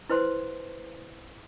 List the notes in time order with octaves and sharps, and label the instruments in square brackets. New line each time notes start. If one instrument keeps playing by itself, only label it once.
[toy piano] E4 B4 C5 C6